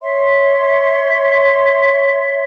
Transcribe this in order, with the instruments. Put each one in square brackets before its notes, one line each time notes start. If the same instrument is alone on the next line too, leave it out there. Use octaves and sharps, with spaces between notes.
[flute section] C#5 E5 C6